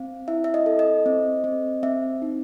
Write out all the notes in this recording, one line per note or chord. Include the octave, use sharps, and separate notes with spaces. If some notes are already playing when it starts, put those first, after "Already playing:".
Already playing: C4 F5
E4 E5
E5
D#5
A4
D#5
C4
C4
C4 E5
D#4